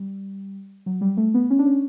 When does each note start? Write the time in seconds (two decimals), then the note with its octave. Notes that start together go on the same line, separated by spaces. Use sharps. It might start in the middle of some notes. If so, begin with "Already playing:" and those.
Already playing: G3
0.86 F#3
1.01 G3
1.17 A3
1.34 B3
1.50 C#4
1.59 D4
1.66 C#4